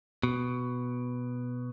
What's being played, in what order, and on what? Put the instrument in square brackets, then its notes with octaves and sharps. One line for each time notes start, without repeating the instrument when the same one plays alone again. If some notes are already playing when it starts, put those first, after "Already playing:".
[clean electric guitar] B2